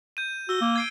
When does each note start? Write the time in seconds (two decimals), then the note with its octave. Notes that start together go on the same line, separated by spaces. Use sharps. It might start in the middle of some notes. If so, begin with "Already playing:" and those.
0.17 G6 D#7
0.49 F#4 E6 G7
0.61 A#3
0.76 G#6 C7 D7